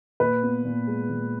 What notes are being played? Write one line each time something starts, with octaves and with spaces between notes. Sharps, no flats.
A#2 B4
B3
A#2
G#3
A#2